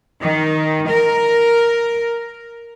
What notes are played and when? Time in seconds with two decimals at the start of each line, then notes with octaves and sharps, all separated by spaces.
0.21 D#3
0.90 A#4